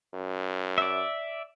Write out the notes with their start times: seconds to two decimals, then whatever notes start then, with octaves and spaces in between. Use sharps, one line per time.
0.14 F#2
0.78 D5 E5